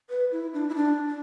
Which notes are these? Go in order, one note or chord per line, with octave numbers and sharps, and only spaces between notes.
B4
E4
D4
E4
D4
D4